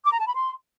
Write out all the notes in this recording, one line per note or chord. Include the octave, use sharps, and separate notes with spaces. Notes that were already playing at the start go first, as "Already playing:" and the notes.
D6
A#5
A5
B5
C6